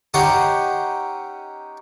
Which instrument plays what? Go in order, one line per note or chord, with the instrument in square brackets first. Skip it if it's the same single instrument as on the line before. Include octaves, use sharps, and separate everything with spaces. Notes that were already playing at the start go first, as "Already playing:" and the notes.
[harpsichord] C#4 D#4 G4 F#5 C6